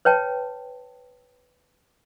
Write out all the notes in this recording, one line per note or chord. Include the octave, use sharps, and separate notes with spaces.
B4 C#5 G5 A5